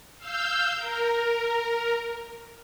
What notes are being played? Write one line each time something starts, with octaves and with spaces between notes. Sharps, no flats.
F5 E6 G6
A#4